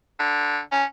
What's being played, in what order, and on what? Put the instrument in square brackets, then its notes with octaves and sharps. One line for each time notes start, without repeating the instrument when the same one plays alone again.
[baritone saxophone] D3
C#4